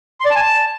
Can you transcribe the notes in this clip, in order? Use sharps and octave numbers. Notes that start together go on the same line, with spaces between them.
C6
D5
A5
G#5
A5